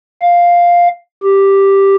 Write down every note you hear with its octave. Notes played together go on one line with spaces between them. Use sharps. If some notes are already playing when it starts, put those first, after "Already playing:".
F5
G4